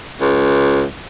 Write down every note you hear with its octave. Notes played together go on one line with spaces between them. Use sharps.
C#2